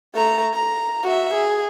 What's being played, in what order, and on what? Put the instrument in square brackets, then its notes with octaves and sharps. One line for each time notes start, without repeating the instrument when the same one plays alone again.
[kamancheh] A3 A#5
A#5
F#4 E5
G#4